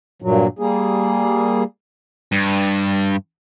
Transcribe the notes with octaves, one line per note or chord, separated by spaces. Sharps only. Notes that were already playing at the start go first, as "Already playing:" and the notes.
G2 A#2 F#3
G3 A#3 G#4
G2